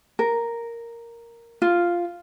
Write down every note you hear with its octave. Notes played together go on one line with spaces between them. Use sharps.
A#4
F4